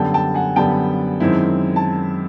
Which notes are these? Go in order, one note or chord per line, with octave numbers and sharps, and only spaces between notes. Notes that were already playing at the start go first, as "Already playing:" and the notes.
Already playing: F#2 D3 G3 B3 G5 A5
G5 A5
F#5 G#5
F#2 D3 G3 B3 G5 A5
F#2 D#3 G#3 C4 E4
A5